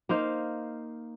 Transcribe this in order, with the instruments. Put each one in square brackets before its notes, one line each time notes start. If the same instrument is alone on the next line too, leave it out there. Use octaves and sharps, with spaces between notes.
[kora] A#3 D#4 C5 F5